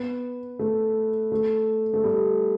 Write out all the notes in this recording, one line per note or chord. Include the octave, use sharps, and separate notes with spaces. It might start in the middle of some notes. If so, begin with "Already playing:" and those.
Already playing: B3
A3
A3
A3
G3